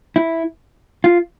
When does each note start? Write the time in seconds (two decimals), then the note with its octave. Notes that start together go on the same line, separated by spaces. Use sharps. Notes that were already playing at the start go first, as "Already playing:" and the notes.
0.16 E4
1.04 F4